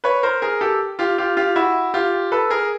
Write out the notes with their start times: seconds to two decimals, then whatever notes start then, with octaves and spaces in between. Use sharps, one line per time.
0.04 B4 C#5
0.23 A#4 C5
0.42 G#4 A#4
0.61 G4 A4
0.99 F4 G4
1.18 F4 G4
1.37 F4 G4
1.56 E4 F#4
1.94 F4 G4
2.32 A4 B4
2.50 G#4 A#4